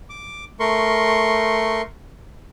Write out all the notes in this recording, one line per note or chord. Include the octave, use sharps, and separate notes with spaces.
D6
A3 A#4 C6 C#6